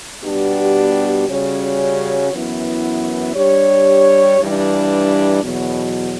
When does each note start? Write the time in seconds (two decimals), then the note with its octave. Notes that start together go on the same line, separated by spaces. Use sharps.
0.23 B2 G3 B3 D4 G4
1.28 C#3 G3 C#4 F#4 C#5
2.31 F#2 E3 B3 E4
3.36 G3 D4 G4 C#5
4.40 G2 E3 G3 D4
5.43 E2 B2 F#3